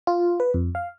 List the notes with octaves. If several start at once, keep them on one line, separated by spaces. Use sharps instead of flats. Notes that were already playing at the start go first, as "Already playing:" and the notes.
F4
B4
F2
F5